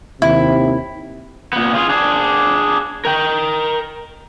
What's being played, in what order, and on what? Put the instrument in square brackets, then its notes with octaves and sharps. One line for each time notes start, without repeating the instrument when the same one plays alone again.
[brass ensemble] D#2 C3 [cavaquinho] E4
[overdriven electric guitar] A#2 B3
F4 G#4
D4 G#4
A#4 G5